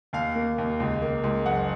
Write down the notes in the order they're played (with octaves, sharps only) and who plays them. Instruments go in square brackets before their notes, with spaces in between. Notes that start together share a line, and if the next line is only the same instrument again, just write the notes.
[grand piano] D#2 F5
A#3
D#2
C#2
A#3
C#2
F#1 F#5